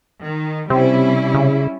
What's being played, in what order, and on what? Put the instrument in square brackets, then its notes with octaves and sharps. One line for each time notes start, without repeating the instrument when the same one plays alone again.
[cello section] D#3
[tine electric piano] C3 [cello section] G3 C#4 E4 [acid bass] C4
[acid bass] C#3